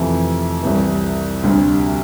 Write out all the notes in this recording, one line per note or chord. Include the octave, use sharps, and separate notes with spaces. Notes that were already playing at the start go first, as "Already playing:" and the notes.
Already playing: F2 C3 E3 A3
C2 C3 E3
D2 C3 G3 C4